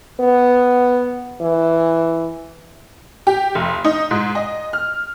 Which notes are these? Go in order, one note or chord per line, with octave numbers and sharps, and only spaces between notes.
B3
E3
G4
F1
D#4
G#2
D#5
F6